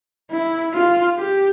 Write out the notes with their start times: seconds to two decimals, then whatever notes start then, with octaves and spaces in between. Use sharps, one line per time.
0.31 E4
0.74 F4
1.18 G4